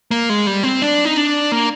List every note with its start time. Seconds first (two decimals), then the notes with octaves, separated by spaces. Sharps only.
0.11 A#3
0.30 G#3
0.47 G3
0.63 C4
0.82 D4
1.05 D#4
1.17 D4
1.52 A#3